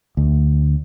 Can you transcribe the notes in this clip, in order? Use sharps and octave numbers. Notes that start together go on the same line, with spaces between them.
D2